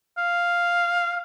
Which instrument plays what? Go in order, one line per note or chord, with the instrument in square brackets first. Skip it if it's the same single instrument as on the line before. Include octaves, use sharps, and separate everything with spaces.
[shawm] F5